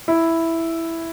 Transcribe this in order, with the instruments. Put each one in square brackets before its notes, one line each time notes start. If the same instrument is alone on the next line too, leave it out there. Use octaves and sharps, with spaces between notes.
[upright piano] E4